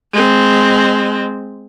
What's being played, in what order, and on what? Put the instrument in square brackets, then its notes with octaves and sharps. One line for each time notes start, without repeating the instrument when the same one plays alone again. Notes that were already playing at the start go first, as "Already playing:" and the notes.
[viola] G#3 C4